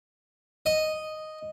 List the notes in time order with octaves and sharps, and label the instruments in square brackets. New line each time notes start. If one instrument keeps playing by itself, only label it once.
[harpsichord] D#5